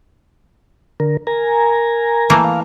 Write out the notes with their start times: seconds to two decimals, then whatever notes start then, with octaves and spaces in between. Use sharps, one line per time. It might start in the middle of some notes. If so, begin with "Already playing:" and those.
1.00 D3 A#4
1.27 A#4 G#5 A#5
2.30 E3 A3 A#3
2.44 F5